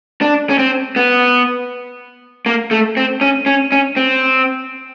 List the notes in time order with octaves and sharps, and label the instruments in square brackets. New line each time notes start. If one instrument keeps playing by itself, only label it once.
[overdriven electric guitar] D4
C#4
C4
B3
A#3
A3
C4
C#4
C#4
C#4
C4